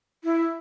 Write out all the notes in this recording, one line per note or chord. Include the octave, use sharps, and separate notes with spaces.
E4